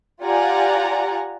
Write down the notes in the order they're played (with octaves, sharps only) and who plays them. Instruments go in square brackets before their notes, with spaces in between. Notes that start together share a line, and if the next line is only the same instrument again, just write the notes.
[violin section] F4 G4 D5 F#5 G#5 A#5